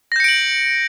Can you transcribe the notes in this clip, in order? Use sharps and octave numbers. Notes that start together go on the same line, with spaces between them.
G6 A#6 C#7 D7 F#7